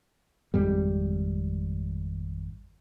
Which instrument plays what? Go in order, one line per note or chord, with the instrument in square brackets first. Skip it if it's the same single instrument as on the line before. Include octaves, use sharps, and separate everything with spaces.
[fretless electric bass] G#1 F2 G#2 G3